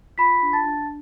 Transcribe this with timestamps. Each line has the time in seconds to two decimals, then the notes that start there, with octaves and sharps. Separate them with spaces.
0.18 F4 B5 B6
0.42 D4
0.53 A5 A6
0.65 D4